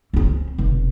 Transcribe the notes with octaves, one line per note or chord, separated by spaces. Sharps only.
C4 C#4
F1 B2